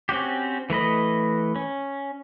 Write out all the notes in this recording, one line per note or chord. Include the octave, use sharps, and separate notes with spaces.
C4 C#4 F#4 G4
E3 A3 B4 D#5
C#4